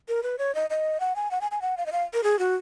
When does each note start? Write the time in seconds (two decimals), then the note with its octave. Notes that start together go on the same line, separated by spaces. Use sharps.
0.08 A#4
0.23 B4
0.39 C#5
0.55 D#5
0.70 D#5
1.00 F#5
1.16 G#5
1.31 F#5
1.41 G#5
1.51 G#5
1.62 F#5
1.77 F5
1.86 D#5
1.92 F5
2.13 A#4
2.23 G#4
2.39 F#4